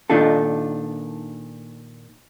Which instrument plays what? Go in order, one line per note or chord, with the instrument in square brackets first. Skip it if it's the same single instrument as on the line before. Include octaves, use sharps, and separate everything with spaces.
[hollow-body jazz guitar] A#2 D#3 D4 D#4 F4 A4